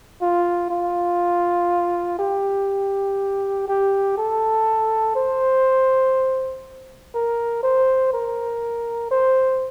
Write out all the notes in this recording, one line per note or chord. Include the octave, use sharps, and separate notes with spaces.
F4
F4
G4
G4
A4
C5
A#4
C5
A#4
C5